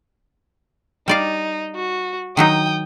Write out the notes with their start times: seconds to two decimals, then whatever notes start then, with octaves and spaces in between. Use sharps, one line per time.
1.08 G3 D#4 D5 F5
1.75 F#4
2.37 D#3 F#3 D#4 G5 D#6